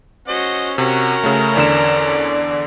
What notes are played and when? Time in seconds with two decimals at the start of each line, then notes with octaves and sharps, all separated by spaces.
0.28 C#4 F#4 C5 D#5
0.78 C3 C#4 F#4 A#4
1.24 C#3 A3
1.56 E2 D3 D5 E7